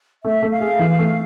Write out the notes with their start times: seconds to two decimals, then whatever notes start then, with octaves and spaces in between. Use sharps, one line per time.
0.24 A3 E5
0.43 A3
0.52 F5
0.61 G#4
0.79 E3
0.99 A3